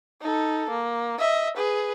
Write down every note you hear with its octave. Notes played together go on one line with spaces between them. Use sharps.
D#4 A4
A#3
D#5 E5
G#4 B4